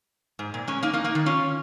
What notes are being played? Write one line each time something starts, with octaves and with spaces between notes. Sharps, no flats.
G#2
A#2
G#3 C#4
A#3 D#4
A#3 D#4
A#3 D#4
D#3
C#4 F4